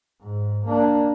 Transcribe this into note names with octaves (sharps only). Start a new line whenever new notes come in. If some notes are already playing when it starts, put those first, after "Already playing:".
G#2
A#3 D4